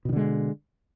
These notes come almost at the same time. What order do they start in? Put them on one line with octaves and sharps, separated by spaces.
B2 D#3 D3 G#3